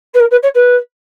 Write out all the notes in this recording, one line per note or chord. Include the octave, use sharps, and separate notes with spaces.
B4
A#4
B4
C#5
B4